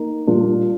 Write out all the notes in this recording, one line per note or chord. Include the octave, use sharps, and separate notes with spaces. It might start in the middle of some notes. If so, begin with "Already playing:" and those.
Already playing: A#3 D#4
A#2 G3 D4 F4